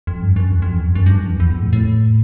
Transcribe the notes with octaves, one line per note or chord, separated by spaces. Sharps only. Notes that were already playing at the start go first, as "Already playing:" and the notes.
F2
G2
F#2
E2
F2
E2
F#2
F#2
G2
F2
E2
E2
F2
A2
A2